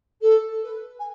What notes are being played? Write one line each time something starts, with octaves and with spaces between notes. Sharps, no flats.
A4
B4
G#5